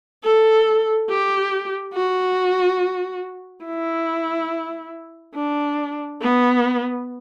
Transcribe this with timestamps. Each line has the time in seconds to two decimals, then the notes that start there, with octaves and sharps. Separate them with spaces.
0.24 A4
1.09 G4
1.94 F#4
3.65 E4
5.35 D4
6.21 B3